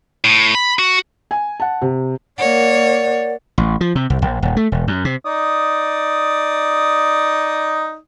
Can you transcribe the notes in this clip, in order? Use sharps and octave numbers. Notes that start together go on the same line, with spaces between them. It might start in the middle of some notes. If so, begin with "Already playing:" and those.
A2
B5
F#4
G#5
F#5 A5
C3
A#3 A#4 C#5 D5 F#5
A1
F3
C3
C2
A#1
D#1
A3
E1
F#2
C3
D#4 D5 D#6